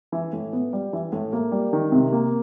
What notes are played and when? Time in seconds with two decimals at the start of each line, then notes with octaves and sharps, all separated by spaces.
0.12 E3
0.33 A2
0.53 B3
0.73 G3
0.93 E3
1.12 A2
1.33 A#3
1.52 G3
1.73 D#3
1.92 C3
2.12 A#3